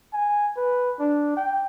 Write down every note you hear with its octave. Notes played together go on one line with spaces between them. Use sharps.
G#5
B4
D4
G5